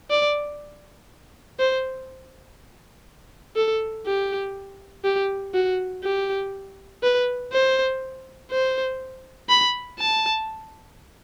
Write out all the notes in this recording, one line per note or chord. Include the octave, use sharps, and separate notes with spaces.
D5
C5
A4
G4
G4
F#4
G4
B4
C5
C5
B5
A5